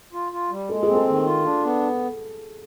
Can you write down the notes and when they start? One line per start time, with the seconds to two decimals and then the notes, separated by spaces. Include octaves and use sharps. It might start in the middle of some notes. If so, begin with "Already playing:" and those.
0.13 F4
0.32 F4
0.51 G3
0.69 G#3 A4
0.83 G#4
0.88 C4
0.95 A4
1.07 D#3
1.26 F4
1.45 D4
1.64 B3